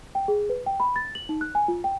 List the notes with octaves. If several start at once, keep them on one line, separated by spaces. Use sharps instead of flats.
G5
G#4
B4
G5
B5
A6
F#7
D#4
F#6
G#5
F4
G5